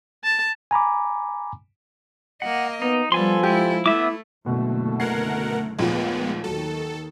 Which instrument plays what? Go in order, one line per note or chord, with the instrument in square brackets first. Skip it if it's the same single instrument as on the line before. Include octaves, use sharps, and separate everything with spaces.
[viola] A5
[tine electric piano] G#5 A#5 B5 D6
[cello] A#3 D#5 [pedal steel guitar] F#5
[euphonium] B3 [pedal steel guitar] D#4
[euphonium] F3 [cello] G3 B3 [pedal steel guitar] A4 G#5 C6
[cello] G#3 E4 [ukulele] G4
[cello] A3 [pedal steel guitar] B3 E5 D6 [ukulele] E4
[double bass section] F#1 D3 A3 [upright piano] B2
[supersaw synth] B2 A#4 F#5 [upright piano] G#6 [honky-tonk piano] C7
[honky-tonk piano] A#1 D#2 A#2 [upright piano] F3 [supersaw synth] G#3 B3 [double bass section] A3
[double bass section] D#2 D#3 [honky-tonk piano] F#3 [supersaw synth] A4